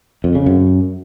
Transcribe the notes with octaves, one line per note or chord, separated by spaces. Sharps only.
F2
C#3
F#2